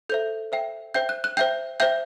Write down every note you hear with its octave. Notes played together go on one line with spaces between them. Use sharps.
A4 C5 E5 G6
C5 E5 G5
C5 E5 G5 G6
F#6
F#6
C5 E5 G5 G6
C5 E5 G5 G6